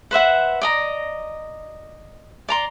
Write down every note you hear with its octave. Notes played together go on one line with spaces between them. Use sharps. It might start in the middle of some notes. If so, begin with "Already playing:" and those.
B4 C5 E5 F#5
D5 D#5 A#5
D5 A#5 C6